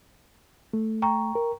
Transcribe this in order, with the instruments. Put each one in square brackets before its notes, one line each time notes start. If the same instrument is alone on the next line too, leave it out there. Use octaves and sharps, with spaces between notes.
[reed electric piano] A3
[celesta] G5 A#5 C#6
[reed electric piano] A#4